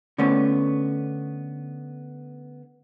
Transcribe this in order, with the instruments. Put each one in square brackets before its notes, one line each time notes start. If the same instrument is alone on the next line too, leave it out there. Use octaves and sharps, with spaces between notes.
[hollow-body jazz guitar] D3 A3 B3 C#4